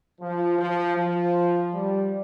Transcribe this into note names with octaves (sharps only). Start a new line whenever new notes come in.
F3
F3
F3
G3